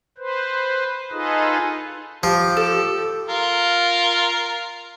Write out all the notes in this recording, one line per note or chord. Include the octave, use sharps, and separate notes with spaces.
B4 C5
D#4 F4 G#4 A4 B4 D#5
F3 G4
A4
F4 A#4